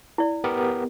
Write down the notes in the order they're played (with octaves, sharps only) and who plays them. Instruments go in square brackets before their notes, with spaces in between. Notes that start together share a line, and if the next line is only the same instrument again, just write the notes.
[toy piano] E4 D5
[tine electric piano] B3 G4 A#4